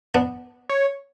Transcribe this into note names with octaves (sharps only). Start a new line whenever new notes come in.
B3 D4
C#5